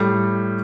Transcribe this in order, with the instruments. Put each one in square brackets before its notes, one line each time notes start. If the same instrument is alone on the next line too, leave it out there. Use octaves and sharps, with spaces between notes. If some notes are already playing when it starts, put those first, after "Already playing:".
Already playing: [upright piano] A2 G3